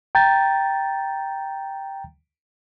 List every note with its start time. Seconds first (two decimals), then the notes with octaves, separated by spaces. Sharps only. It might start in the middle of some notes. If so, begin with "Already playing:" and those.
0.15 G5 A#5 G6 A6